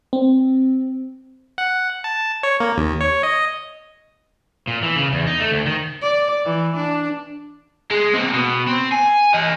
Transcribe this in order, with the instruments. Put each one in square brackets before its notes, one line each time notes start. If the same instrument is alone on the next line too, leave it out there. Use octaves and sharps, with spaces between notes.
[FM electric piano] C4
[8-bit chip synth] F#5
A5
C#5
A#3
D#2
C#5
D#5
[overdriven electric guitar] A#2
E3
C#3
E2
D#4
A3
D2
D#3
[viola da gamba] D5
E3
D4
[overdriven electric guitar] G#3
A#3 C4
B2
C4
G#5
G4 D#5